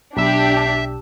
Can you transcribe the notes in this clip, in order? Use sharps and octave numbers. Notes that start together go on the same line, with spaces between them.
B1 D4 G4 E5 E6